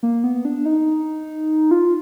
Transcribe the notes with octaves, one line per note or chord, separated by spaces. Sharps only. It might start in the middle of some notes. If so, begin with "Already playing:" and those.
A#3
B3
D4
D#4
F4